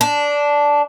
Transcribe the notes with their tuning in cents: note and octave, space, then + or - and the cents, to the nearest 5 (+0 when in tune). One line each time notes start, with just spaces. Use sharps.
D4 -10